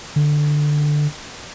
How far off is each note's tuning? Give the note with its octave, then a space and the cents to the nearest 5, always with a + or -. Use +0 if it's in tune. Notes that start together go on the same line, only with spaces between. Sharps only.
D3 +10